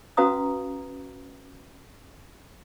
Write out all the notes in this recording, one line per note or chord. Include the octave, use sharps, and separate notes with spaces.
C#4 F#4 B4 F5 A#5 D#6